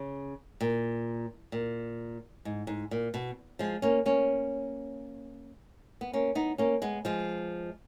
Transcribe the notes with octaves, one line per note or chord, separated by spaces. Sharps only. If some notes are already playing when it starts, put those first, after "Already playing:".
Already playing: C#3
A#2
A#2
G#2
G#2
A#2
B2
F3 G#3
A#3 C#4
A#3 C#4
B3
A#3 C#4
B3 D#4
A#3 C#4
G#3 B3
F3 G#3